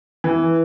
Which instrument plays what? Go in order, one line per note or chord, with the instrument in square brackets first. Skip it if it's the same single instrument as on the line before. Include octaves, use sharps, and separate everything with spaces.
[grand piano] E3